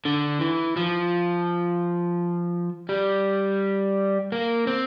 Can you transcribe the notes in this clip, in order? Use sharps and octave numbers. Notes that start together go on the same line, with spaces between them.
D3
E3
F3
G3
A#3
C4